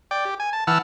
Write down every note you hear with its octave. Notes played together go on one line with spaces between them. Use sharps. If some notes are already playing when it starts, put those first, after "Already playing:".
D5 G5
G4
G#5
A5
E3 F#5 A5 E6 F6